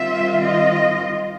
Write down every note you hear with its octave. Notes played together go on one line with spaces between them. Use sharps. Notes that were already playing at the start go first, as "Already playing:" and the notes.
Already playing: D#3 G3 C4 F4 E5
D#5